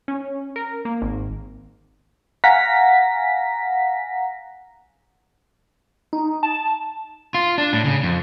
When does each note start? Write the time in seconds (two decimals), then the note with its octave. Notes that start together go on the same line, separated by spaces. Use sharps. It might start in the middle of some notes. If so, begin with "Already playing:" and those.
0.08 C#4
0.56 A#4
0.85 A#3
1.02 G#1
2.44 F5 F#5 G#5 A#5 A#6 B6
6.13 D#4
6.43 A5
7.34 F4
7.58 D4
7.73 A2
7.85 C#3
8.03 F2